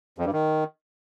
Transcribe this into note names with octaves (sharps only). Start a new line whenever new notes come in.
F2
G2
D#3